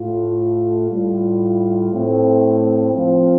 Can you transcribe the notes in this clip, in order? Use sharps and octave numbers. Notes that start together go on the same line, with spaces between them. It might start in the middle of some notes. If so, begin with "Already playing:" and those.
Already playing: A2 A3 F4
A2 G3 F4
A2 A3 C4
F3 C4 F4